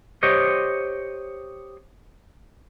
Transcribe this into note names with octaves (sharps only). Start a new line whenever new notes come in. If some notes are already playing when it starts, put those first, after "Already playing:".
G4 C5 C#5 D#5